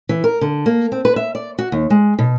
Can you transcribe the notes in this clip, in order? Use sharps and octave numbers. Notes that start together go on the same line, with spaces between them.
E3
A#4
D3
A#3
C4
B4
E5
D5
F#4
D#2
G#3
B2